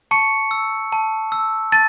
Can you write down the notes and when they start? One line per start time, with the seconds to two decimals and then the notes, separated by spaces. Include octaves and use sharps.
0.11 A5 C#6 C#7
0.51 E6
0.93 A5
1.32 E6
1.72 A5 A6